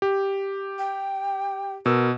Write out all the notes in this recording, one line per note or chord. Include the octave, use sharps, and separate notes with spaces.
G4
G5
B2 A#4 E6